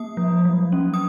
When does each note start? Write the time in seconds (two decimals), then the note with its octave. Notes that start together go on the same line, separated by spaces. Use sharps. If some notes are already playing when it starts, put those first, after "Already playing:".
Already playing: A#3 D#6
0.17 F3
0.45 F#3
0.72 C#4
0.94 D#6